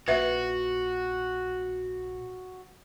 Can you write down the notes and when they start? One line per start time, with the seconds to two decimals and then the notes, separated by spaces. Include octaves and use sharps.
0.08 A#1 F#4 B4 E5